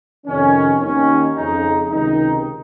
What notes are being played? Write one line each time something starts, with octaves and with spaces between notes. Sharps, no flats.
F2 C3 D#3 C#4
D#2 D#3 C#4
F2 C#3 D#4
C#2 C3 D#3 D#4